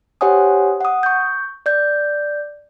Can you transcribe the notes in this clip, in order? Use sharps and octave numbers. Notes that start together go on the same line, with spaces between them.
G4 C5 C#5 F#5 G#5 D#6
F#5 D#6
C#6 G6
D5 G6